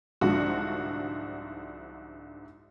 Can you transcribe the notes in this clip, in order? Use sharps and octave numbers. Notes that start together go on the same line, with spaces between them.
C2 G#2 D3 F3 F#4